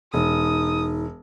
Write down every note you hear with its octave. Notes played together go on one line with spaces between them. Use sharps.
E1 D#4 D#6